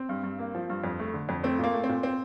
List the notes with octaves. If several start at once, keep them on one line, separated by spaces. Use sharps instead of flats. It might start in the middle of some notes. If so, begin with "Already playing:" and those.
Already playing: C4
G2
G2
A#3
F3
G2
F2
A3
D3
F2
A3 C4
A#2 A#3
A3
C4
A#2
C4